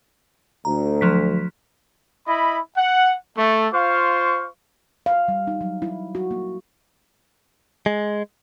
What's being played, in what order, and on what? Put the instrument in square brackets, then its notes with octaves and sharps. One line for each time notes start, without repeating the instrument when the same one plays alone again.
[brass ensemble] D2 [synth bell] A#5
[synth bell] F3 F#3 B6
[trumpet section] E4 D#5 B5
F#5
A3
F4 C5 F5 C#6
[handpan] F5
G3
D#4
F#3
E4
F#4
A#3
[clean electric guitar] G#3